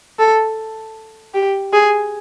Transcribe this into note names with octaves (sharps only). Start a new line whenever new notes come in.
A4
G4
G#4